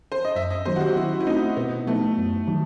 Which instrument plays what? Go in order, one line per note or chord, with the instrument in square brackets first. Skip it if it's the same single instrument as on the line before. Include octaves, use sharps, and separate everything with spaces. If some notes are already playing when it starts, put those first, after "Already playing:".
[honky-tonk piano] C5
D#5
[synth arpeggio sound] F#2 [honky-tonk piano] E5
[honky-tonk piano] D#5
[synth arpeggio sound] D#3 F#3 B3 [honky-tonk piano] C5
[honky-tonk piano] F#4
G4
[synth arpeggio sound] D#3 [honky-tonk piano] E4
[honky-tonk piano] E4
[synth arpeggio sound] A3 C4 F#4 [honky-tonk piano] D#4
[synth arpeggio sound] B2 [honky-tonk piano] B3
[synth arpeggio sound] F#3 B3 D#4 [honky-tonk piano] A3
[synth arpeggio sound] F#2
D#3 F#3